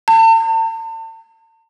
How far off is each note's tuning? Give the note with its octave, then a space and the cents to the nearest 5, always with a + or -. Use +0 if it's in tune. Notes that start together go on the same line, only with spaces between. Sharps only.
A5 +40